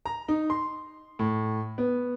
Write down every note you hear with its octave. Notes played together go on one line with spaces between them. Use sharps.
A#5
D#4
C6
A2
B3